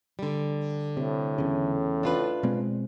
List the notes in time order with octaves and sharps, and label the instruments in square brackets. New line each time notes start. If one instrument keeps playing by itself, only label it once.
[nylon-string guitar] D3 G3
[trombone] A2 [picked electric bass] C3
[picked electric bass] E2 C#3
[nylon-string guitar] D4 F4 B4
[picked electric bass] B2 G#3 C4